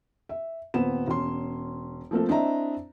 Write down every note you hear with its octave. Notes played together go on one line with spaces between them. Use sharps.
E5
D#1 B3 C4 E7
E1 C#4 C6
F3 A3 A#3 C4 A4
C4 D4 E4 D#5 E5 A#5